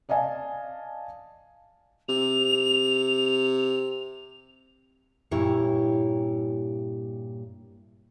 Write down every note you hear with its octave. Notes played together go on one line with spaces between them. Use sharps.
D5 D#5 F5 G#5 A5
C3 F7
G2 A#2 E4 G4 C#5